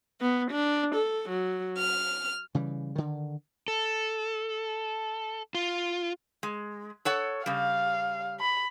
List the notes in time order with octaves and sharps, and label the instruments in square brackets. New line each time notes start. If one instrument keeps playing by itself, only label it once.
[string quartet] B3
D4
A4
F#3
F6
[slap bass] C#3 E3 G3
D3 D#3
[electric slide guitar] A4
F4
[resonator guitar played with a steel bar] G#3
A4 C#5 F#5
[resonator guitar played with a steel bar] C#3 G3 [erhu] F5
[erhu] B5